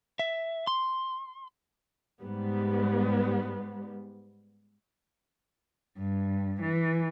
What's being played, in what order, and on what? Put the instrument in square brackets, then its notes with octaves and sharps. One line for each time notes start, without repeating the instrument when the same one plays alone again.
[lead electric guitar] E5
C6
[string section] G#2 G3 B3
[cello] G2
E3